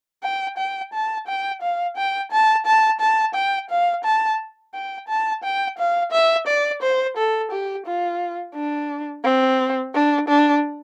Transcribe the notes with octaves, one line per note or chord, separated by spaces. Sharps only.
G5
G5
A5
G5
F5
G5
A5
A5
A5
G5
F5
A5
G5
A5
G5
F5
E5
D5
C5
A4
G4
F4
D4
C4
D4
D4